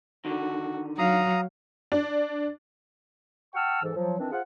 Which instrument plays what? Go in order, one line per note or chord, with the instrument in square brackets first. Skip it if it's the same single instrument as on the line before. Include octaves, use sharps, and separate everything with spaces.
[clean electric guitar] D3 D#3 [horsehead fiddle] F#4
[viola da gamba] F#3 [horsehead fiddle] F5 [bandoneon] A#5 D#6
[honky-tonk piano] D4
[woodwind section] F#5 G5 A5 C#6 E6 F6
G#2 E3 A4
F3 F#3
D#3 E3 C4 D4
F4 G#4 C5 F#5